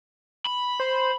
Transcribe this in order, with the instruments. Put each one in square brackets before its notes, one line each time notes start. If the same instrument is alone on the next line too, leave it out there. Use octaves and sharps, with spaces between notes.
[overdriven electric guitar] B5
[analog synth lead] C5